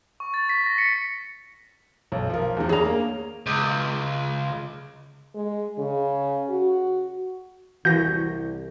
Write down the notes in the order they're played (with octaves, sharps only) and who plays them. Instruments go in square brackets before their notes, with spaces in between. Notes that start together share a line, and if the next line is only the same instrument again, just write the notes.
[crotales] C#6
A6
B6
A#6
C#7
[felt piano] B1
F3 A#4
E2 D#3
[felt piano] C#4 D4 [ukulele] G#4 A#5
[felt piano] A#3
[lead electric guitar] C#2
[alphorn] G#3
C#3
F#4
[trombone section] C2 [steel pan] E3 F#4 [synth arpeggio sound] G6 A#6